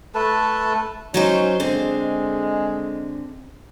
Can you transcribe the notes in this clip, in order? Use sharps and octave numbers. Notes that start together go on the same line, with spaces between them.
A3 A4 B4 A5
F#3 C#4 D#4 C5
D3 G#3 C4